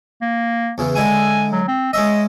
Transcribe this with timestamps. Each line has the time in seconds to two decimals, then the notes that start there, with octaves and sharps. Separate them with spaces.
0.22 A#3
0.78 E2 C#3 E3
0.96 D3 G#3 E4 G#5
1.53 F#3
1.68 C4
1.93 G#3 C#4 D#5 E5